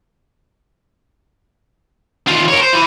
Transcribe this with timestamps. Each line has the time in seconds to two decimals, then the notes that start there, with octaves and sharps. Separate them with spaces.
2.27 D#3 F4
2.48 A#4 C#5
2.60 C5
2.73 E3